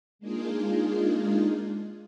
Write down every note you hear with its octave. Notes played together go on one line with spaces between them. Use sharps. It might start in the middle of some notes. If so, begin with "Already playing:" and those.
G#3 A#3 D4 D#4 F4 G#4